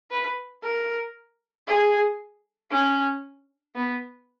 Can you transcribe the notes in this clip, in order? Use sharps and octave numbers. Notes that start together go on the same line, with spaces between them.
B4
A#4
G#4
C#4
B3